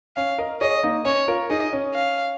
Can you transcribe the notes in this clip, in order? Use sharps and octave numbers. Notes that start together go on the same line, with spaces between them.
C#4 F5
A#4 D#5
G#4 C#5 D#5
A#3 D#4
C#4 C#5
F4 A#4
D#4 G#4 D#5
C#4
F5